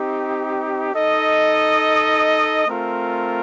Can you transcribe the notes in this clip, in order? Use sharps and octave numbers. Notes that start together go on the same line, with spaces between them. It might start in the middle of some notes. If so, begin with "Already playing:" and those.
Already playing: C4 D#4 G4
D#4 A4 D#5
A3 C4 F4 A#4